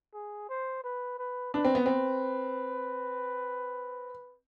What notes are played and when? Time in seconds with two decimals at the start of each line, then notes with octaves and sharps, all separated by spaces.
0.14 G#4
0.49 C5
0.84 B4
1.19 B4
1.54 D4 B4
1.65 C4
1.75 B3
1.86 C4